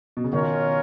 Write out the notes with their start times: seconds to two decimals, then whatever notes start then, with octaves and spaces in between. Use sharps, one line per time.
0.17 B2
0.24 C#3
0.33 B2 D#3 C#4 F4 A#4 C#5